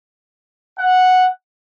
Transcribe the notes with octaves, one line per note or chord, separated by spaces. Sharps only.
F#5